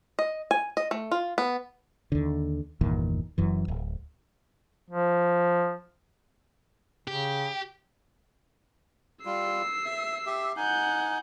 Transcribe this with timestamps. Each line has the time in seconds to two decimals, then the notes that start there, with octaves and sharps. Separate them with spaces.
0.19 D#5
0.51 G#5
0.77 D#5
0.91 A3
1.11 F4
1.38 B3
2.12 D#2 D3
2.81 G1 E2 A#2 D#3
3.38 F#1 F#2 E3
3.68 D1
4.90 F3
7.08 C#3 G4
9.25 G3 F4 E6 C7
9.85 E5
10.26 G4 E5
10.57 D#4 F#5 G#5 G6